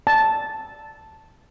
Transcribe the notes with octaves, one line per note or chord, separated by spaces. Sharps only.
A5